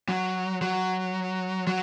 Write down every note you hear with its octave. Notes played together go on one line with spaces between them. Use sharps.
F#3
F#3
F#3